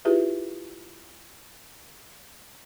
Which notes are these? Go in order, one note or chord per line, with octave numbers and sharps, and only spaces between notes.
E4 F4 G4 G#4 B4 E5